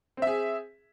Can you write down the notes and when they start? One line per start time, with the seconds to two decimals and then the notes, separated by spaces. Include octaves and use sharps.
0.17 C4
0.22 E5
0.27 G#4